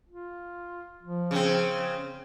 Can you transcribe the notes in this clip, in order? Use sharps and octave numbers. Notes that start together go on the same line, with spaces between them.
F4
F3
C#3 C4